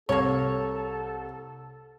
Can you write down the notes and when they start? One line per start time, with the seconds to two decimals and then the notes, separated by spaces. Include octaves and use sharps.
0.09 C2 A#3 A4 C#5